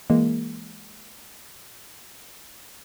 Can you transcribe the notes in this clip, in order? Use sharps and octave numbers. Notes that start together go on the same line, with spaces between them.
E3 G#3 A#3